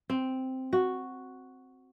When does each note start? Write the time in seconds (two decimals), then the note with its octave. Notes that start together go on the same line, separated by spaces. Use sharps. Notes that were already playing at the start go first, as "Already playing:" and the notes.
0.10 C4
0.73 F#4